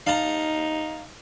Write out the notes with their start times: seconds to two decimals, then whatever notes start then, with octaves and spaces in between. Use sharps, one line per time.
0.07 D#4 F5 A5 A#5